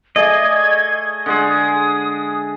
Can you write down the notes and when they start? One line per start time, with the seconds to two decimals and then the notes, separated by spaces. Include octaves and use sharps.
0.16 A3 G#4 D5 D#5 G#6
1.26 D3 G#3 G#4 D#6